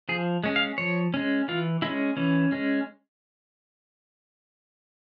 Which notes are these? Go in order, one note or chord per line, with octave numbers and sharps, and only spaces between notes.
F3 G#4
G#3 C#4
F5
F3 C#5
G#3 C#4
E3 F4
G#3 C#4 E4
E3 C#4
G#3 C#4